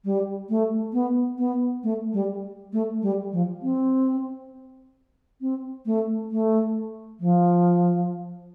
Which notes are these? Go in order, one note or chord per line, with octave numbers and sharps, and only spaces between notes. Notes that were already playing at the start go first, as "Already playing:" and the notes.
G3
A3
B3
B3
A3
G3
A3
G3
F3
C4
C4
A3
A3
F3